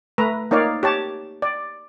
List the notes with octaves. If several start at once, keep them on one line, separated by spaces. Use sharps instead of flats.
A3 B4 A#5
A#3 D#4 C#5 D5 F5
G4 C#5 A5
D5